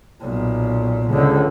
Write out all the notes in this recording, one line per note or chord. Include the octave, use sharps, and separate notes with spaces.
B1 A#2
C#2 D3